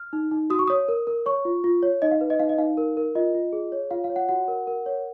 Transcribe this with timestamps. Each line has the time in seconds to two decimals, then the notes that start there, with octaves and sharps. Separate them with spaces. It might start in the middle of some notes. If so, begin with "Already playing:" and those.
Already playing: F6
0.13 D#4
0.31 D#4
0.50 F#4 D#6
0.59 C#6
0.68 C#5 D#6
0.88 A#4
1.07 A#4
1.26 C#5 C#6
1.45 F4
1.64 F4
1.83 C#5
2.02 D#4 D#5
2.11 F5
2.21 B4
2.30 D#5
2.39 D#4 F5
2.49 D#5
2.58 D#4 F5
2.77 A#4
2.97 A#4
3.15 F4 D#5
3.35 F4
3.53 G#4
3.72 C#5
3.91 F4 F5
4.04 F5
4.10 C#5
4.16 F#5
4.29 F#4 F#5
4.48 A#4
4.67 A#4
4.86 C#5